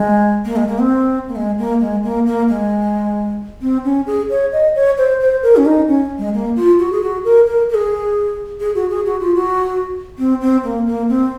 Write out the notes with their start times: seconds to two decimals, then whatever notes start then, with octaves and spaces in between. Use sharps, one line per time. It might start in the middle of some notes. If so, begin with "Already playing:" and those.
Already playing: G#3
0.45 A#3
0.56 G#3
0.68 A#3
0.79 C4
1.28 A#3
1.36 G#3
1.58 A#3
1.80 G#3
2.03 A#3
2.26 A#3
2.49 G#3
3.62 C4
3.85 C#4
4.07 G#4
4.30 C#5
4.52 D#5
4.75 C#5
4.98 C5
5.20 C5
5.43 A#4
5.56 C#4
5.65 D#4
5.88 C#4
6.19 G#3
6.34 A#3
6.56 F4
6.79 F#4
6.92 G#4
7.02 F#4
7.24 A#4
7.47 A#4
7.69 A#4
7.74 G#4
8.60 G#4
8.75 F#4
8.90 G#4
9.06 F#4
9.20 F4
9.35 F#4
10.19 C4
10.41 C4
10.63 A#3
10.87 A#3
11.09 C4